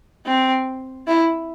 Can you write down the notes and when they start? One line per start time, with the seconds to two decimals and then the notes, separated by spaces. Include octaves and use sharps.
0.26 C4
1.07 E4